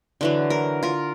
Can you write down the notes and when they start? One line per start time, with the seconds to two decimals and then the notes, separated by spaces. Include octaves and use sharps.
0.21 D3 E3 F#3
0.50 A#4
0.83 F4 A#4